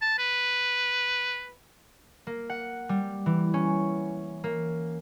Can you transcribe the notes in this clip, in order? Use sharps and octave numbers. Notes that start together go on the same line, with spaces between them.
A5
B4
A#3
F#5
G3
E3
C#4
A#3